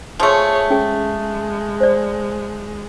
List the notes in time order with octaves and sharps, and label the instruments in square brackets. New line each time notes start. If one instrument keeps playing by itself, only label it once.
[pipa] F3 A3 [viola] G#4 C#5
[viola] G#3 [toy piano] C#4 G#4
[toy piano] C5 D5